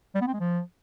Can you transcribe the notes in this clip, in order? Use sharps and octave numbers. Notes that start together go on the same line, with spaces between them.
G3
B3
C4
G#3
F3